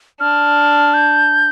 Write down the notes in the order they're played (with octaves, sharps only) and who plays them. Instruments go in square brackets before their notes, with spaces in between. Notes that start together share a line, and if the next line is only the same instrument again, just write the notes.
[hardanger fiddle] D4 [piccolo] F6
[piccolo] G6